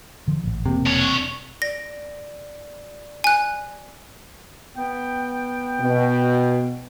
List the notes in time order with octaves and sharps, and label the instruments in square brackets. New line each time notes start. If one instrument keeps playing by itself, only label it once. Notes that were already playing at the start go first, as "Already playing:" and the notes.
[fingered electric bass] D3 F3
A1 G#2
[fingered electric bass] E1 A#3 [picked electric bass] C3
[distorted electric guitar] D4 C#5
[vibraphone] D5 [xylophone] A#6
[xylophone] G#5 F#6
[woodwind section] B3 G5
[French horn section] B2